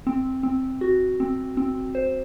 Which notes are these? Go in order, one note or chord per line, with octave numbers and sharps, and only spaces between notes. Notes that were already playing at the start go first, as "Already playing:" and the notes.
C4
C4
F#4
C4
C4
C5